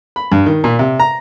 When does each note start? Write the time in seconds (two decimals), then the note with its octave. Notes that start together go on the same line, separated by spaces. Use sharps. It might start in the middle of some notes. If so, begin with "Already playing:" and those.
0.16 B5
0.32 G2
0.46 D#3
0.64 A#2
0.79 C3
1.00 A#5